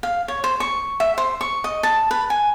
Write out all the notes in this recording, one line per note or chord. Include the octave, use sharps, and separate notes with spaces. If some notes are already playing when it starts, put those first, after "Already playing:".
F5
C#5
C5
C#6
E5
C5
C#6
D#5
A5
B4
G#5